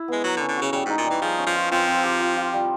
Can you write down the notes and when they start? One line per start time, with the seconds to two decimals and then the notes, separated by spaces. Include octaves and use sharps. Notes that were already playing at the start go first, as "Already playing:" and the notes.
Already playing: E4
0.08 G#3 B3
0.24 F#3 A#4
0.37 D3
0.40 C#4
0.48 D3
0.57 C#3 F#4
0.72 C#3 G3
0.86 G#2 D#4
0.98 A#2
1.06 E3 G3
1.22 F3 G#4
1.39 C#4
1.46 F3
1.55 F4
1.71 F3 C4
1.87 C4
2.04 G4
2.20 F4
2.36 F4
2.53 G3